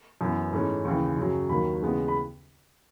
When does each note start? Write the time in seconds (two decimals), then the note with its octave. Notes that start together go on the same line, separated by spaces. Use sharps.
0.21 F#2 E3 B3
0.52 G#2 E3 A3 C#4
0.85 D#2 C#3 E3 C#6
1.17 F#2 C#3 F#3
1.49 D#2 D#3 F#3 B5
1.82 D#2 C#3 E3 G#3 B3
2.08 B5